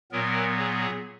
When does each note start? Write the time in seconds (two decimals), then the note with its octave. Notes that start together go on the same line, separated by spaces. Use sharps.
0.11 A#2 F#3 B3 A#4
0.58 G#4